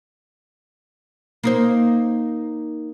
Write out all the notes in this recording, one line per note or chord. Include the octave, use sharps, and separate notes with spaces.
A#3 D#4 C5